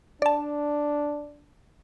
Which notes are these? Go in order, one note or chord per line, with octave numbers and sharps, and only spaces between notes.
D4 D5 A5